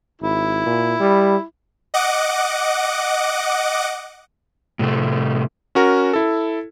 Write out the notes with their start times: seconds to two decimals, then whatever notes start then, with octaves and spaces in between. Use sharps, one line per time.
0.21 G#1 E4
0.66 A#2
1.00 G3
1.94 D#5 F#5 D6
4.79 A2 C3 A3
5.75 C#4 F#4 A#4
6.13 E4 A4